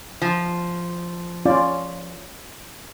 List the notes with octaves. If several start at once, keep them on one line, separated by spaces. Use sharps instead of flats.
F3
C#4 F4 D5